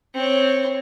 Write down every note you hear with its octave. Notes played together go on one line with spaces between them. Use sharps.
C4 C#5